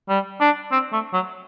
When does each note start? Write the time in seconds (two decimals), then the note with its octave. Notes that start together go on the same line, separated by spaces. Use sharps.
0.09 G3
0.40 D4
0.72 C4
0.92 A3
1.13 F#3